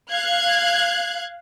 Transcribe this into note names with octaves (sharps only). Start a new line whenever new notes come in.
F5 F#6 G#6